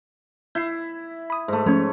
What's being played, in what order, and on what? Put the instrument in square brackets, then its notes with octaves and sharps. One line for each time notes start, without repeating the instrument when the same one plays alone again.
[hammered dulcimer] E4 [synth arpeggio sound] G6 C7
[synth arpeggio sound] B5 D#6
[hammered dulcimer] G#2 A3
[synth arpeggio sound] F3 A3 C#4 [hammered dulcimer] C#5